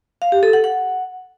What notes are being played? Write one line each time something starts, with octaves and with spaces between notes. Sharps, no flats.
F5
G4
A4
F#5
F#5